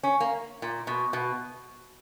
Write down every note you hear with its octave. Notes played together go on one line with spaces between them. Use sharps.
C#4
A#3
A#2
B2
B2